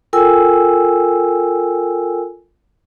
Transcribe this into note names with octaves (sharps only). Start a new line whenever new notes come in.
F4 A4 A#4 G5 G#5 E6